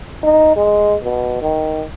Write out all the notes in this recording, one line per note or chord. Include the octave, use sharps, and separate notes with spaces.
D#4
G#3
B2
D#3